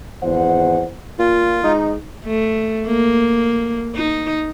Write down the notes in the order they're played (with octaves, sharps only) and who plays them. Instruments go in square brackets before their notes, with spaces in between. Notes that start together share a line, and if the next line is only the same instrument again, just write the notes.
[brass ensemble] G#1 E2 G#2 C5 F#5
[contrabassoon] A#2 [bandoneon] F4
[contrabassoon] G#2 [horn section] D#4
[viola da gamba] A3
A#3
D#4